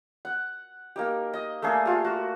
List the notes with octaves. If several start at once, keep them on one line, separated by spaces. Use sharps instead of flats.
F#5
A#3 D#4 G4
D#5
A3 A#3 D4 G#4
F4 G4
F#4